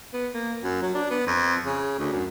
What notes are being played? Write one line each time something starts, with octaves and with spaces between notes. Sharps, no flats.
B3
A#3
F#2
F#3
D4
B3
F2
C#3
D2
F#2